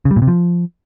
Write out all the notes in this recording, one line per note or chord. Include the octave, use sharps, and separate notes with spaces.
C#3
G3
A#2
C3
F3